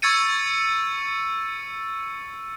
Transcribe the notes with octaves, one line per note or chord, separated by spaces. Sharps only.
C#6 E6 G#6 A6 C#7 D#7